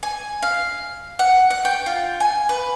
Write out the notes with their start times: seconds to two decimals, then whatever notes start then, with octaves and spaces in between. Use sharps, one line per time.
0.03 G#5
0.42 F5
1.19 F#5
1.50 F#5
1.65 G5
1.86 F4
2.20 G#5
2.49 B4